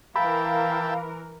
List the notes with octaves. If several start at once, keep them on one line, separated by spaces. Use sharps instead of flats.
E3 A#4 E5 F5 G5 A5 B5